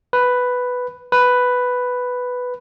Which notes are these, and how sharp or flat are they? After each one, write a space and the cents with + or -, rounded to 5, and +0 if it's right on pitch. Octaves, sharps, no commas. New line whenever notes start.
B4 +5
B4 +5